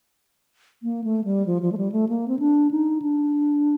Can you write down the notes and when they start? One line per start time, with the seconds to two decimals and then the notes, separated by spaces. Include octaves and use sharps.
0.83 A#3
1.04 A3
1.24 G3
1.46 F3
1.62 F3
1.72 A3
1.78 G3
1.92 A3
2.09 A#3
2.28 C4
2.39 D4
2.71 D#4
3.02 D4